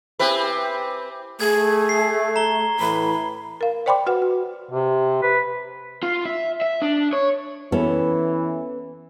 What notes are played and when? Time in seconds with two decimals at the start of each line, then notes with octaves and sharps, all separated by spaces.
0.19 C4 E4 G4 B4 G#5
1.40 A3 G#4 G#6
1.89 C7
2.36 A#5 G7
2.80 A2 E3 B5
3.61 A#4 F5
3.86 C5 D5 G5 B5 C6 D6
4.07 F#4 B4 F#5
4.22 F#4
4.71 C3
5.22 B4
6.03 F4
6.25 E5
6.61 E5
6.82 D4
7.13 C#5
7.72 E3 B3 C#4 A4